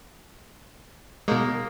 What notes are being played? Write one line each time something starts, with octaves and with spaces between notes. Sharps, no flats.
B2 G#3 A#3 D#4